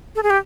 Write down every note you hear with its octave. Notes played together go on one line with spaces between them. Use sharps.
A4
G#4
G4